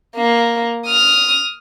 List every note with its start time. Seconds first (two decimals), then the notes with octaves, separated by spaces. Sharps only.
0.16 A#3
0.86 D#6 F6